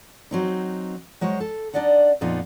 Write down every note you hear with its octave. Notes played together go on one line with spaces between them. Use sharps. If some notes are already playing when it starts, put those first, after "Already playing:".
F#3 C4 D#4
F#3 G#3 C5 C#5
A4
D4 D#4 D5 D#5 F#5
F2 A#2 B3 D#4 F4